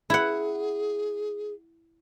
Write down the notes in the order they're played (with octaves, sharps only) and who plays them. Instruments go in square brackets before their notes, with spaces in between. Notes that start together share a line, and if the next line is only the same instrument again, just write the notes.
[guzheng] E4 F#5 [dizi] G#4